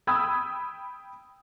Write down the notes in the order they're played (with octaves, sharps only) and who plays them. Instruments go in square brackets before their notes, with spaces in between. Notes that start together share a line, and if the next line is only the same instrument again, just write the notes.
[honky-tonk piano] G5 B5 D#6 E6 G#6